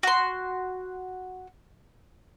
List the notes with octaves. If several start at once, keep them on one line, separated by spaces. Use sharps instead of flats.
F#4 C6